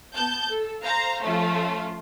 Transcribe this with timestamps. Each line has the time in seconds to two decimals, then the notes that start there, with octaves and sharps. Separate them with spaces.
0.15 B3 A5 G6
0.48 A4
0.83 C5 F5 A#5
1.24 F3 A3 C#4 F4